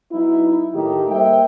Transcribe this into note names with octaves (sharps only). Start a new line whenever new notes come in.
F#3 B3 D#4 E4
A2 D#3 G4
G3 A#3 C5 E5 G5